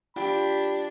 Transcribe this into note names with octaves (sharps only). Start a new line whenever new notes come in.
D4 F4 G4 B5